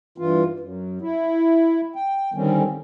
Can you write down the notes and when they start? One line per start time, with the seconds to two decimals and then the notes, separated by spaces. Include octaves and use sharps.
0.18 G2 E3 F4
0.59 F#2
1.01 E4
1.96 G5
2.34 D3 D#3 G3 C4 C#4